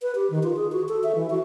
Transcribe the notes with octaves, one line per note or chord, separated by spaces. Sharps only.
B4
G4
D#3
F4
G#4
F#4
A4
E5
E3
F#4